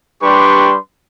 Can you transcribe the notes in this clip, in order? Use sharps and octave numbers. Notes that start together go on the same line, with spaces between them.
G3 D4 G4 B4 C6 C#6